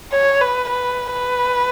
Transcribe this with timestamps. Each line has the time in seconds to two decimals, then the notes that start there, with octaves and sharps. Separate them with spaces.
0.12 C#5
0.41 B4
0.70 B4
1.12 B4